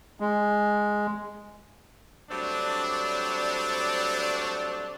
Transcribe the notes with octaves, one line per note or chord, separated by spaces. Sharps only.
G#3
F#3 G3 A3 C4 D4